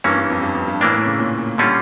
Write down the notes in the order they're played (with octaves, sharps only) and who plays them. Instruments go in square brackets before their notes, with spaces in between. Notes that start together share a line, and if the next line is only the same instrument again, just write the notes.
[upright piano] G2 [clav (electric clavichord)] E3 A#3 C#4
[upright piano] G2
F2
G2
F2
G2
[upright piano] A2 [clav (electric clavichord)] E3 A#3 D4
[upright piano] A2
C#3
A#2
A#2
[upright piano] A#2 [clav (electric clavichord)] D3 G3 C#4 F4